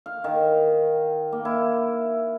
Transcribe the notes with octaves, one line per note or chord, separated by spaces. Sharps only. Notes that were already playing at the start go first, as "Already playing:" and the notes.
F5
D#3
A#3
E4